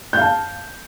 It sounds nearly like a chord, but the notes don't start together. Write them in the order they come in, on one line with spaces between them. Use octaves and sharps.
G6 F5 A5